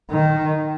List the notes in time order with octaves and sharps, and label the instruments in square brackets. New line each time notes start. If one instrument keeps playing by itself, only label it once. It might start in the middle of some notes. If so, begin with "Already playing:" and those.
[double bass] D#3